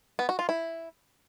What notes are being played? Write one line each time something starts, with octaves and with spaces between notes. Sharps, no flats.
B3
F#4
F4
E4